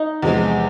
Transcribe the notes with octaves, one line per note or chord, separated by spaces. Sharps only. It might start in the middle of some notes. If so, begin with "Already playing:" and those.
Already playing: D#4
E2 C3 F3 G#3